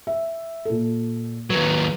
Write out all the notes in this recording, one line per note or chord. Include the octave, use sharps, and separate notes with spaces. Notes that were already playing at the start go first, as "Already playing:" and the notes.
E5
A#2 A4
D#2 F#3 B4